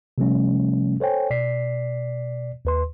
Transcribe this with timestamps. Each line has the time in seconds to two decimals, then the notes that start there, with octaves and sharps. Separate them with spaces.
0.18 C3 F3 G3 A3 C#4
1.00 A4 C5 C#5 G5 G#5
1.30 B2 D5 B6 C7
2.65 D#2 B4 C6